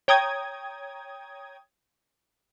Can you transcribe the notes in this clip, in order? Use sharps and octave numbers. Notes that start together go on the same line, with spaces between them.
C#5 G5 A#5 D#6 G#6